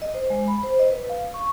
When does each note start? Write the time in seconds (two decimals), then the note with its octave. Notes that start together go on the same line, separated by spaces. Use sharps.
0.02 D#5
0.14 C5
0.30 G#3
0.48 B5
0.63 C5
0.79 D#5
0.91 B4
1.09 F5
1.34 C#6